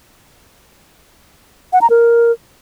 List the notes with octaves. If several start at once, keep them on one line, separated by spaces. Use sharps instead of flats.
F#5
A#5
A#4